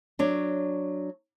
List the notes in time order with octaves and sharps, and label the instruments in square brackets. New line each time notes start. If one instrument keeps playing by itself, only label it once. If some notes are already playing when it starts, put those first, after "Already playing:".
[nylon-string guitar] F#3 D4 C#5